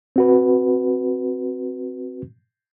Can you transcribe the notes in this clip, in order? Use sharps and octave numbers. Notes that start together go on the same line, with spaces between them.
C4 F#4 B4